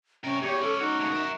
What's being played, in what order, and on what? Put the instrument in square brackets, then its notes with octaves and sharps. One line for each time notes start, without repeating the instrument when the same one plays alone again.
[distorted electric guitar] C3 A#4 [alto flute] C#4
[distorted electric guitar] E2 [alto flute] G4 [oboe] C#5
[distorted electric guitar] C#4 D5 [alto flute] A4
[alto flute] D#4 [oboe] F#4
[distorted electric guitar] A2 C#3
A#4 E5